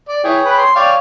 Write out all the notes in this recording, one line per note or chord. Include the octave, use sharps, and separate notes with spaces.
D5
E3 G#4 C#5 G5
B4
C6
C#5 D5 F5 G5